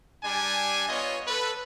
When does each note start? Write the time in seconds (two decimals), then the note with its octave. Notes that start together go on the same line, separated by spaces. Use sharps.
0.23 G3 D4 G#5
0.89 B3 F4 C#5 D#5
1.27 A4 B4